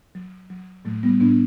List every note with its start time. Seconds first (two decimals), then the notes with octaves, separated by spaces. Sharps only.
0.15 F#3
0.50 F#3
0.85 A2 F#3 A3
1.03 G3 B3
1.20 A2 B3 D4